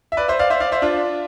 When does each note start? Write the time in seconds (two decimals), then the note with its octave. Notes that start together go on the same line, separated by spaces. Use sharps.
0.12 E5
0.17 B4 D5
0.28 C5 E5
0.39 D5 F5
0.50 C5 E5
0.60 D5 F5
0.72 C5 E5
0.82 D4 F4